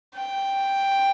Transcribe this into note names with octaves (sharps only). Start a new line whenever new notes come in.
G5